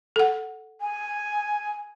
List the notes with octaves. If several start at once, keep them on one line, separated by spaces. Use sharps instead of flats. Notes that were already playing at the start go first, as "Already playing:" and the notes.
A4 F#5
G#5